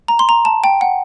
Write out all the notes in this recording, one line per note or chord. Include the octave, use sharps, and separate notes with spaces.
A#5
C6
A#5
A5
G5
F#5